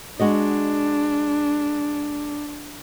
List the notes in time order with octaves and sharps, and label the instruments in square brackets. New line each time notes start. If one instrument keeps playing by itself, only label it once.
[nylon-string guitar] G#3 F#4 D#5 [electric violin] D4